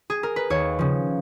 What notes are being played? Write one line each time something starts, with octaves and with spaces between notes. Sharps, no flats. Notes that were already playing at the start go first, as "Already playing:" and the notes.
Already playing: F#4
G#4
A#4
B4
D#2 C#5
C#3 F3